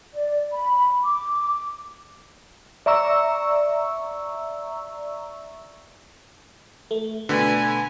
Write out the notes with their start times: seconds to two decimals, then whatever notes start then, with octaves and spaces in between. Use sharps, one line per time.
0.14 D5
0.52 B5
1.04 D6
2.86 D5 E5 A#5 C#6 E6
6.91 A3
7.29 B2 D3 A3 B4 G#5 B5